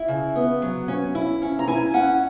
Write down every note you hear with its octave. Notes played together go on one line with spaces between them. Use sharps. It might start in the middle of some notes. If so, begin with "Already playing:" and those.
Already playing: E4 E5
C#3
B3
F#3
C#4
E4
C#4
A#5
E4 G#5
C#4 F#5